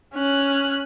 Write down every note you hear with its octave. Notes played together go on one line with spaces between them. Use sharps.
C#4 F#6